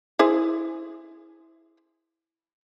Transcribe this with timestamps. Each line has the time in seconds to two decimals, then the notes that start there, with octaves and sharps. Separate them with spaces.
0.19 E4 G#4 C5